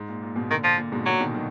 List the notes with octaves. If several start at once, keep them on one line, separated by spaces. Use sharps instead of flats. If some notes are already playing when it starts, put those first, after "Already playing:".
Already playing: G#2
A#2
A#2
G#2 B2
A#2 D3 D#3
F3
A#2
G#2 B2
A#2 D3 F#3
B2 D#3
D#3 F#3